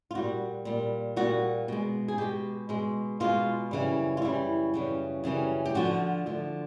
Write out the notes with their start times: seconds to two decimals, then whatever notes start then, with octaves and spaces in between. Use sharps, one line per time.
0.11 F4
0.15 A#2 G3 F#4
0.65 A#2 G3
1.16 A#2 G3 F#4
1.68 B2 G#3
2.08 G#4
2.18 B2 G#3 G4
2.69 B2 G#3
3.20 B2 G#3 F4
3.71 F#2 C#3 E3 G3
4.17 F4
4.22 F#2 C#3 E3 G3 E4
4.74 F#2 C#3 E3 G3
5.24 F#2 C#3 E3 G3
5.65 G4
5.75 D2 D3 F3 F#4
6.26 D2 D3 F3